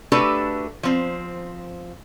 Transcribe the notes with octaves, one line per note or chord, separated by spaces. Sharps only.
A3 D4 F#4 G4 A4 B4
F3 C4